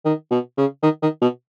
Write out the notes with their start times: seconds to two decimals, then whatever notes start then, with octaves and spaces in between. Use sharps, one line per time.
0.05 D#3
0.31 B2
0.57 C#3
0.83 D#3
1.02 D#3
1.21 B2